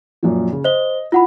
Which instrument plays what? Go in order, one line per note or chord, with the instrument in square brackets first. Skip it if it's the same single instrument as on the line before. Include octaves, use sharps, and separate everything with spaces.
[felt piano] F#2 A#2 F3
C#3
[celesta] C5 G7 [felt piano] D#5
[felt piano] E4 [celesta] F4 F#5 B5